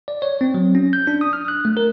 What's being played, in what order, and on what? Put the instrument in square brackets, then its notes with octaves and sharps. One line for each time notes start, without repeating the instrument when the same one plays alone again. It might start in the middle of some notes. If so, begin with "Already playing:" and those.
[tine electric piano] D5
C#5
C4
F#3
C#4
G6
D4
D#6
F6
F#6
A3
A#4